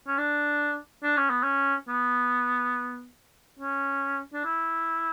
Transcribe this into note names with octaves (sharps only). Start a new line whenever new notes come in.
C#4
D4
D4
C#4
B3
C#4
B3
C#4
D4
E4